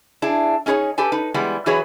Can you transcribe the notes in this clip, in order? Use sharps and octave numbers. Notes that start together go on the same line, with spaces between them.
D4 E4 G#4
C#4 D#4 G#4 B4 C#5
G4 A4 B4 G#5
D#4 B4
E3 G3 G#3 B3
E3 F#3 F#4 G#4 B4 C#5